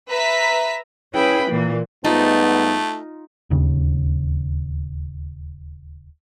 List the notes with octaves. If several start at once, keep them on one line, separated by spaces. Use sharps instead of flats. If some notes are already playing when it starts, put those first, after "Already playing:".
B4 E5 A#5 B6
C#4 E4 G#4 B4 G5 B5
A#2 E3 A#3
G#2 G3 A3 B3 D#4 F4
D1 D#2 C#3